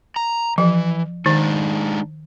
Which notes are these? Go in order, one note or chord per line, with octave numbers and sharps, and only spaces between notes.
A#5
E3 F3
D#3 G#3 D4 D#4